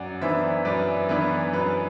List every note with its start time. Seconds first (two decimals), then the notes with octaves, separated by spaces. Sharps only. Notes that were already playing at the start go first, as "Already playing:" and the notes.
Already playing: F#2 D5 F#5
0.21 E3 B3 D4 C5 E5
0.65 F#2 B4 D5
1.09 E3 B3 D4 B4
1.53 F#2 B4